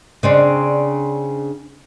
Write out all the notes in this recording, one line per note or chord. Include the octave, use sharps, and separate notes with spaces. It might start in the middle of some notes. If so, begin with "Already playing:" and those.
C#3 C4 D4